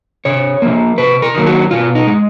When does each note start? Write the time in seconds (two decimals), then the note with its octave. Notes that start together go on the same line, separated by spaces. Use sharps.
0.25 C3 C#5
0.62 F3 A#3
0.98 C3 B4
1.22 A#4
1.35 D#3 F#3 A#3
1.46 F#4
1.71 B2 F4
1.95 D#4
2.07 G#3